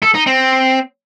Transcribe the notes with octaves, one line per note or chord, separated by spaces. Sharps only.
A4
D#4
C4